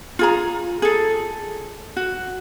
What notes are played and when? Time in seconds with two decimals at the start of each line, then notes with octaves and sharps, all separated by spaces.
0.19 F4 G#4 A#5
0.82 G#4 A4
1.96 F#4